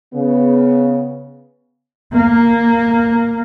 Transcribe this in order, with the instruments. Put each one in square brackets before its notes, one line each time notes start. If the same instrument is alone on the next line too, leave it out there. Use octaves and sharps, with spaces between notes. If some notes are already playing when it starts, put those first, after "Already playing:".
[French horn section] C#3 B3
[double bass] A#3